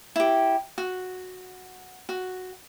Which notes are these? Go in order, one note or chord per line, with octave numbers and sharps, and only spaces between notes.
E4 G4
F#4
F#4